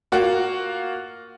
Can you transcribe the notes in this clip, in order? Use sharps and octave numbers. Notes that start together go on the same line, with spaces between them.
A#3 F4 F#4